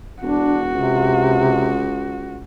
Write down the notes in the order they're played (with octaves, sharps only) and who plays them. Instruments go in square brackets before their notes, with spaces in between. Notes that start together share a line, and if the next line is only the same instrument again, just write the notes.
[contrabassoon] E1 [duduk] D4 [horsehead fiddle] F#4
[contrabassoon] C#2 [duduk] C3